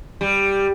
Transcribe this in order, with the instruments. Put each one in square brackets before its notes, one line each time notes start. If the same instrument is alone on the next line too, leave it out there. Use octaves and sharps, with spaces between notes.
[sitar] G3